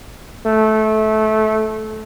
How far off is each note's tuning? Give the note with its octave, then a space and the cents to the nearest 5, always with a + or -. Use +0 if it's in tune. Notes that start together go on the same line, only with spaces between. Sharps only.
A3 -20